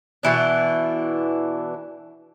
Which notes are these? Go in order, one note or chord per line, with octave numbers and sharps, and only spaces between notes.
B2 E3 D4